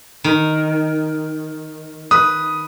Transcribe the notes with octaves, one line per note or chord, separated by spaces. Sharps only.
D#3
B4 D#6